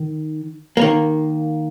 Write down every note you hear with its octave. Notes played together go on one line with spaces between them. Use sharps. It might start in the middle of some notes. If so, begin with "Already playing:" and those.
Already playing: D#3
D#3 A#3